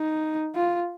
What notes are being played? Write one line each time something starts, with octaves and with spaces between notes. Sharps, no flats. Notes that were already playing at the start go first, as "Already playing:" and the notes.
Already playing: D#4
F4